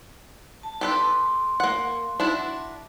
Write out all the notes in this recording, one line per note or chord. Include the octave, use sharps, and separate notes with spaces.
A5
G4 A4 B4 C6
A#3 F#5
D4 E4 F#4